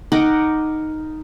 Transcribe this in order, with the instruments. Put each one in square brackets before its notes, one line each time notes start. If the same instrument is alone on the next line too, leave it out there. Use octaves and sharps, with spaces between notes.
[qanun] D#4 A#4 F#5 D6